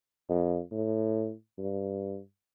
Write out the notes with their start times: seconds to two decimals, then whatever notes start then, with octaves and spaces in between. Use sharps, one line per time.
0.29 F2
0.72 A2
1.59 G2